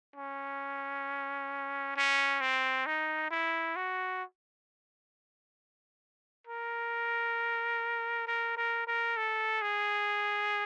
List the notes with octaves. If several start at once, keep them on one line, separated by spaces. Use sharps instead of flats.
C#4
C#4
C4
D#4
E4
F#4
A#4
A#4
A#4
A#4
A4
G#4